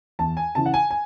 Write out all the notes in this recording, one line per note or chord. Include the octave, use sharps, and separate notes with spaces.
E2 A5
G#5
C#3 E3 A5
F#5
G#5
G#5